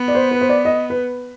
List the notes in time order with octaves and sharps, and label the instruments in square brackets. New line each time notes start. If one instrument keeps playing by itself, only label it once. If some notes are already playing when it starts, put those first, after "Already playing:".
Already playing: [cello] B3
[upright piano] D5
C5
B4
C5
D5
D#5
B4